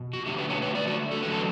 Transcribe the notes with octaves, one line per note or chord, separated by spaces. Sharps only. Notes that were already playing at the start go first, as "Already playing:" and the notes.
Already playing: B2
F#4
D3 A3 D4 G4
B4
C#5
B4
D5
F#4
A4
E2 D3 F#3 B4
A4